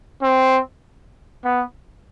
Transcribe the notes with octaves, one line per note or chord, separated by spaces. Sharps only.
C4
B3